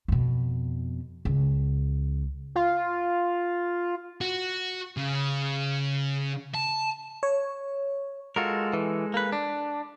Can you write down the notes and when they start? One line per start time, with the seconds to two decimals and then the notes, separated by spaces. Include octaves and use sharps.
0.08 F2 B2
1.25 C#2
2.56 F4
4.21 F#4
4.97 C#3
6.54 A5
7.23 C#5
8.36 G#3 F4 F#4 A4 A#4
8.73 E3
9.14 A#3 B4
9.32 D4